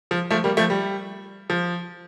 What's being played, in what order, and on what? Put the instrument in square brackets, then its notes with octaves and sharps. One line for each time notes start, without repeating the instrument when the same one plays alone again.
[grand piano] F3
F3 A3
G3 A#3
F3 A3
G3
F3